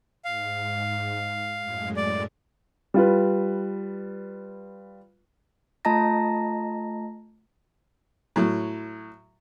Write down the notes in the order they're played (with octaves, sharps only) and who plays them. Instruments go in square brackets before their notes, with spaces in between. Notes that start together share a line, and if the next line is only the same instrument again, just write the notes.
[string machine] G#2 [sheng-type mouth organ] F5
[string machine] F#2 A2 G#3
[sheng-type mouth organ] D5
[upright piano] G3 F4 B4
[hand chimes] A3 F4 D#5 A5 A#5 A#6
[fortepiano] A2 F#3